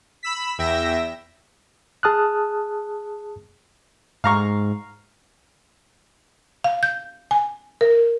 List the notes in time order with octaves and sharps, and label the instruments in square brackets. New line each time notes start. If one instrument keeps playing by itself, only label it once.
[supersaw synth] B5 E6 B6
E2 E5 G5 E6 A#6
[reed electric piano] G#4 A5 D#6 F6 F#6
[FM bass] G#2 [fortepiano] F5 A#5 C#6
[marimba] F5
G6
G#5
A#4